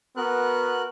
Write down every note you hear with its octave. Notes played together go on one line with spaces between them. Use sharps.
B3 F#4 A#4 F#6